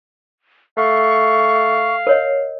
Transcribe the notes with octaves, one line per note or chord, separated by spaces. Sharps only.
A3 F5 C#6
A#4 C#5 D#5